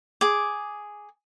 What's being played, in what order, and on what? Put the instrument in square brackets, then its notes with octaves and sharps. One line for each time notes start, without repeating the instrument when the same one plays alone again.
[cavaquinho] G#4 D6